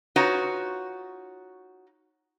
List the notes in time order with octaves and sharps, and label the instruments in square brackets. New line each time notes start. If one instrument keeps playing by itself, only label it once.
[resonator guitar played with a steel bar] D#4 F4 F#4 B4 C#5